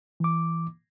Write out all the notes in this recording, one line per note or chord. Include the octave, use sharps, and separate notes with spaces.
E3 D6